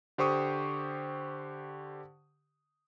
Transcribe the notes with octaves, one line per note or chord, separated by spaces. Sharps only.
D3 G4 C5 G5 C#6 D#6